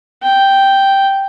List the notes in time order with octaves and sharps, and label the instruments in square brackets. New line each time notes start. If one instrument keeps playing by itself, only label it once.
[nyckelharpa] G5